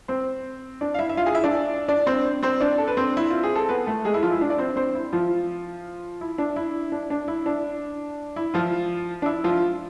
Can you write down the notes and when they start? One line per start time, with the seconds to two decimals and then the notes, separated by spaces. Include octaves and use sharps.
0.08 C4 C5
0.81 D4 D5
0.94 F5
0.99 E4 E5
1.09 E5
1.17 F4 F5
1.26 G#4 G#5
1.34 E4 E5
1.44 D4 D5
1.88 D4 D5
2.07 C4 C5
2.43 C4 C5
2.61 D4 D5
2.78 A4
2.88 B4
2.97 C4 C5
3.17 E4
3.30 F4
3.43 G#4
3.55 A4
3.69 B3 B4
3.86 A3 A4
4.05 G#3 G#4
4.14 E4
4.23 F3 F4
4.32 E4
4.41 D4
4.50 D5
4.58 C4 C5
4.76 C4 C5
4.95 E4
5.13 F3 F4
6.21 E4
6.38 D4
6.56 E4
6.92 D4
7.10 D4
7.28 E4
7.46 D4
8.36 E4
8.54 F3 F4
9.22 D4
9.26 E4
9.44 F3 F4